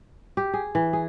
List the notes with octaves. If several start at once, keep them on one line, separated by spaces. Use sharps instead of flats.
G4
G#4
E3
G#4